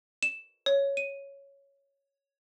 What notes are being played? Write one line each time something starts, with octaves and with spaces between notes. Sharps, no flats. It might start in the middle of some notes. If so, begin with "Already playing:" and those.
E7
C#5
D#7